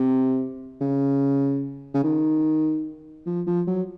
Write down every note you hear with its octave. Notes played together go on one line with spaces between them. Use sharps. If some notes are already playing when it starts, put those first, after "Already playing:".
Already playing: C3
C#3
C#3
D#3
F3
F3
F#3